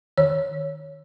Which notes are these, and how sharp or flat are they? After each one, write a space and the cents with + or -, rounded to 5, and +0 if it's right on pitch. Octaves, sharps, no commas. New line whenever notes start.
D#3 -15 C#5 +0